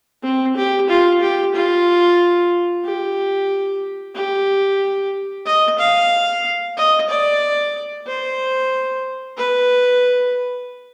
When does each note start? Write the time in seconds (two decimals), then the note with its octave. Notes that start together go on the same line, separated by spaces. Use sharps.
0.23 C4
0.57 G4
0.89 F4
1.21 G4
1.55 F4
2.85 G4
4.15 G4
5.46 D#5
5.78 F5
6.77 D#5
7.09 D5
8.07 C5
9.37 B4